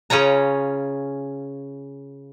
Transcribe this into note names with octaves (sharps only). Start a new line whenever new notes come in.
C#3 C#4 F4 C#5 A#5